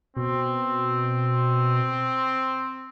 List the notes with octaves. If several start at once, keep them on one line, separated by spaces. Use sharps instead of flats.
B2 C4